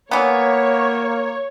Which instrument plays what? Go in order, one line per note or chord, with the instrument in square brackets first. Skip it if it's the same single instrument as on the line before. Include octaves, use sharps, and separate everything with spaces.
[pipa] E3 B3 [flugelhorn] A#3 [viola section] C#5